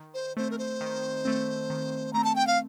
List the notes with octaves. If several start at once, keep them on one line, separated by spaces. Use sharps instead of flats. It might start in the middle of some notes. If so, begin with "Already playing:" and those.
Already playing: D#3
C5
A3 C4 C5
A#4
C5
D#3
A3 C4
D#3
A3 C4 A#5
A5
G5
F5